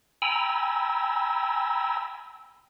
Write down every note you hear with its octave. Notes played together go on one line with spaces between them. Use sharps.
G5 G#5 A#5 B5 E6